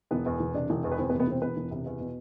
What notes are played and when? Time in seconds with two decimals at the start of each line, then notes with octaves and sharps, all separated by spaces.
0.11 E1 B3 B4
0.26 E2
0.40 E1
0.54 C3 D4 D5
0.70 E1
0.84 E2
0.92 B4
0.98 E1 C4 C5
1.09 B3 B4
1.13 C3
1.20 B3 B4
1.27 E1 C4 C5
1.42 E2 B3 B4
1.57 E1
1.71 C3
1.86 E2
2.00 B2